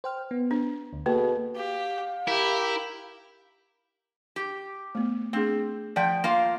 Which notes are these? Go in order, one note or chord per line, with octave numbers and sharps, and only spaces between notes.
C5 G5 F6
B3
D4
D2
B2 A#3 G#4 A4
G4 F5
E4 G4 A#4 B5
G4
A3 B3
A3 C4 D4 G#4
F3 D5 G5
A#3 F4 F5